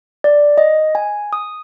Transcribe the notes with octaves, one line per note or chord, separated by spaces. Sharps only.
D5
D#5
G#5
D#6